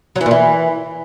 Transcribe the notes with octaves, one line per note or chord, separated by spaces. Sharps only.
F#3
E3
A#2
E3